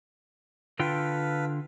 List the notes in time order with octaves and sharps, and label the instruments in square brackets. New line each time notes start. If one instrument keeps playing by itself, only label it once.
[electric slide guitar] D3 F4 G5 [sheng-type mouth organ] A4 B4 F5